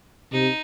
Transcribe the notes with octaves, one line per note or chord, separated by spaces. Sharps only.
C3 D#4